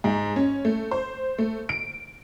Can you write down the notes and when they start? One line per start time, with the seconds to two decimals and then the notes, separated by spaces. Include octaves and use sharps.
0.04 G#2
0.36 C#4
0.65 A3
0.91 C5
1.38 A3
1.69 D7